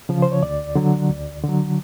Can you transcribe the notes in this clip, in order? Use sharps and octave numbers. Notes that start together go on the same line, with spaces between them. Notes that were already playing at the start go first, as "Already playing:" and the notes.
C#3 F3
C5
C#5
D2 D5
D3 F#3
D2
D3 F#3